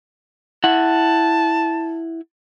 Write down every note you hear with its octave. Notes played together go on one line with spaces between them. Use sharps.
E4 F#5 A5